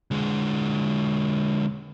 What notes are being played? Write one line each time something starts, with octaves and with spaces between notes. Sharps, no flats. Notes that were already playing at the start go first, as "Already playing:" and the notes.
D3 G#3